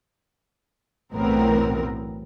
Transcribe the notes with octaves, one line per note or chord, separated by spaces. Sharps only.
B1 E2 A2 B3 C4 A#4